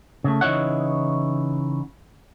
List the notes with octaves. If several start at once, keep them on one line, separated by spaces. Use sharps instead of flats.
C#3 A3
C#3 E3 D#4 E4 C#5 F#5